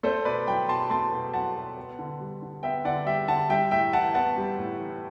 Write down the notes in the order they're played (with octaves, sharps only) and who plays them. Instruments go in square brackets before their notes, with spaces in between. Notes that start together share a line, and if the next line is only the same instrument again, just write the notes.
[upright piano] A3 A4 C5
B2 B4 D5
F#3 G5 B5
B2 A5 C6
A3 A5 C6
B2
F#3 F#5 A5
B2
B3
D3
G3
D3
B3 E5 G5
D3 D5 F#5
G3 E5 G5
D3 F#5 A5
G3 E5 G5
A2 E5 G5
E3 F#5 A5
B3 F#5 A5
G3
A2
E3